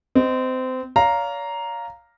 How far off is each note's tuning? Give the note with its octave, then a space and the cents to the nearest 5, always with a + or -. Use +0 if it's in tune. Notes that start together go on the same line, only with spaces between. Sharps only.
C4 -25 D#5 +0
C#5 +45 F5 +0 A#5 +0